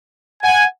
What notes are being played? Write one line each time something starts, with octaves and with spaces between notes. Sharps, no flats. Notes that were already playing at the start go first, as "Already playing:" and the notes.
F#5 G#5